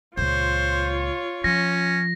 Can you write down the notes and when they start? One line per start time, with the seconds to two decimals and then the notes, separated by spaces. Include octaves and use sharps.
0.17 C#2 A#2 F4 C5 C#5
1.44 F3 C#4 A#6